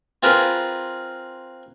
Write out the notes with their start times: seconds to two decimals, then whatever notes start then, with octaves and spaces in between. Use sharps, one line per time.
0.23 C4 F4 G#4 A#4 B4